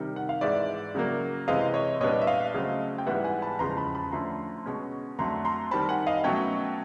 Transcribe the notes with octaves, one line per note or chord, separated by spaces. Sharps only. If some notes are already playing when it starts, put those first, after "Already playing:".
Already playing: C3 D#3 G3
F#5
F5
G#2 E3 G#3 D5 E5
C#3 F#3 A#3
C3 E3 G#3 C4 D#5 F5
C#5 D#5
A#2 G3 B3 D4 C#5 D#5
E5
D#5 F5
C#3 F#3 A3 C4
G5
G#2 E3 G3 B3 E5 F#5
F#5 G#5
A5 B5
E2 C#3 F3 G#3 A#5 C6
A5 B5
A5 B5
D3 F3 A3 C#4 A#5 C6
B2 G#3 C#4
F2 D3 F#3 A3 A#5 C6
A#5 C6
D#3 G3 C4 A5 B5
F#5 G#5
D#5 F5
B2 F#3 A3 C#4 G5 A5